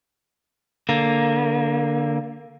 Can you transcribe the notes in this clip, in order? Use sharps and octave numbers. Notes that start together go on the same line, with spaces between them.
D3 A#3